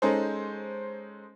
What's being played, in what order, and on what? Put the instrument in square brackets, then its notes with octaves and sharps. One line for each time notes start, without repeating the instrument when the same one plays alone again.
[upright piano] G#3 C#4 D#4 A4 C5